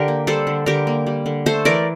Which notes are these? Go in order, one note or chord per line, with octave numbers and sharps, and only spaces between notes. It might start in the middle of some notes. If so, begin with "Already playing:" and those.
Already playing: D3 G4 A#4
A#3
G3 A4 C5
D3
D3 G4 A#4
A#3
G3
D3
A3 A4 C5
E3 A#4 D5